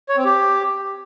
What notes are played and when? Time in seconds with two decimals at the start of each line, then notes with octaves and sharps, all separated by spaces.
0.09 C#5
0.17 C4
0.25 G4